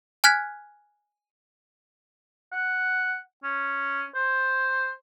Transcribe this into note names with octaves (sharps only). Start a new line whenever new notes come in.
G#5 F6 F#6 G#6 B6
F#5
C#4
C5